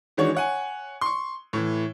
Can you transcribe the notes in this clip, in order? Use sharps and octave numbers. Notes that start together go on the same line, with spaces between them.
D#3 E3 G#3 D4 F#4 C#5
C#5 F#5 G#5
C6 C#6
A2 E3